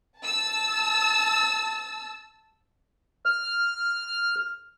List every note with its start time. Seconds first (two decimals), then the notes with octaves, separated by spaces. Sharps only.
0.20 A5 E6
3.26 F6